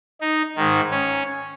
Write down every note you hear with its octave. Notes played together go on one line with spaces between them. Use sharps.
D#4
G#2 D#3
C#4